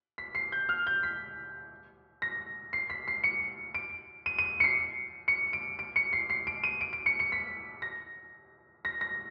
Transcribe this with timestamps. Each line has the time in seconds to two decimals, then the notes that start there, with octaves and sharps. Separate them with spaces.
0.18 B6
0.35 C7
0.52 G6
0.69 F6
0.87 G6
1.03 B6
2.22 A#6
2.73 C7
2.90 B6
3.08 C7
3.24 C#7
3.74 D7
4.26 D#7
4.39 D#7
4.60 C#7
4.64 C7
5.28 C#7
5.53 D7
5.79 D7
5.96 C#7
6.13 C7
6.30 C7
6.47 D7
6.64 D#7
6.81 D7
6.93 D7
7.06 C#7
7.19 C#7
7.32 B6
7.82 A#6
8.85 A#6
9.01 A#6